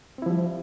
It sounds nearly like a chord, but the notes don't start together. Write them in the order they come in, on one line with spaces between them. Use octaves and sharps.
C4 E4 F3 G3